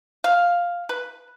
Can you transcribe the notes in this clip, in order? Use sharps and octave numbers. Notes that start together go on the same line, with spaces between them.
F5
B4